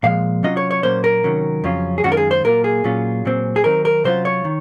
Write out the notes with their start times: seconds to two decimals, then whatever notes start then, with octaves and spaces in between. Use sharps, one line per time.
0.03 A#2 F3 G#3 F5
0.43 C3 F#3 C#4 F4 D#5
0.57 C#5
0.71 C#5
0.83 A#2 F#3 A#3 C#4 C5
1.04 A#4
1.24 C3 D#3 F#3 C#4
1.64 F2 C#3 F#3 C#4 F4
1.98 G#4
2.04 F#2 D#3 G#3 C#4 F4 F#4
2.12 A#4
2.17 G#4
2.31 C5
2.44 A#2 F#3 A#3 F4 A#4
2.64 G#4
2.84 A#2 F#3 C#4 F4
3.25 A#2 F#3 C4
3.56 G#4
3.64 D#3 F#3 C4 D#4 A#4
3.85 A#4
4.04 C3 F#3 C#4 F4 C5
4.25 C#5
4.45 D#3